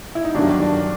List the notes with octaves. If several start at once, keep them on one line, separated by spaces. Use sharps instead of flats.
E4
D#4
G1 G2 D#3 F#3 D4
D4